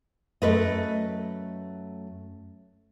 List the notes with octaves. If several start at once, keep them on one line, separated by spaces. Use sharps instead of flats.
F#2 A3 B4 D#5